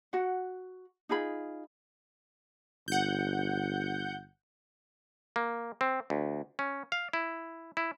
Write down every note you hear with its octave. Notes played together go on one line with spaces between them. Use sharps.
F#4 F#5
D#4 F4 G#4 B5
G1 F#5 G6
A#3
C4
D2
C#4
F5
E4
E4